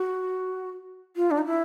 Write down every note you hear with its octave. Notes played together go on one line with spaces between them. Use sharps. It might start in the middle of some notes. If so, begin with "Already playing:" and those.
Already playing: F#4
F4
D4
D#4
E4